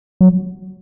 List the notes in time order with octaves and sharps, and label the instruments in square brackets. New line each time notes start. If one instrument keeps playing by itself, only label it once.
[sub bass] F#3